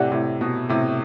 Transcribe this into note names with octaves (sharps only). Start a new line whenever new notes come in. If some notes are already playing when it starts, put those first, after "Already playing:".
Already playing: A2 C3 G4 D5 F#5
A2 C3
B2
A2 C3